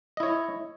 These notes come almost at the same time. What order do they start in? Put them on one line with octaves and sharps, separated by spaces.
D#5 E4 C#5